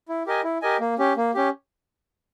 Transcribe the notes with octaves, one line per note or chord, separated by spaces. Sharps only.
E4
G4 A#4 D#5 G#5
E4
G4 A#4 D#5 G#5
A#3
C#4 G4
A#3
C#4 G4